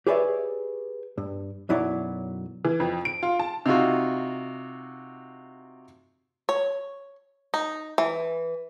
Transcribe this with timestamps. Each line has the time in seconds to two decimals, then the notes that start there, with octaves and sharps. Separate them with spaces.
0.07 G4 G#4 B4 C#5 D5 E5
1.18 G2
1.69 B1 F#2 F#3 E4 C#5 D5
2.65 E3
2.80 F2
3.05 D7
3.23 F4
3.40 A5
3.66 C3 D#4 F4 F#4
6.49 C#5
7.54 D#4
7.98 E3